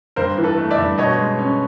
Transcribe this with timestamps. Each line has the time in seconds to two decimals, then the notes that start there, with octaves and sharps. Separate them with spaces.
0.16 G2 A#4 C5
0.38 E3
0.44 A4 B4
0.58 A3
0.71 D5 E5
0.78 G2
0.98 B2 C#5 D#5
1.18 G#3
1.39 C#4